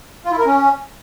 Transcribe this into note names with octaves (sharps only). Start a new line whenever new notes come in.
F4
E4
A#4
C#4